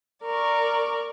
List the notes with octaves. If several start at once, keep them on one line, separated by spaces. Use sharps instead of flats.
A#4 D5 C#6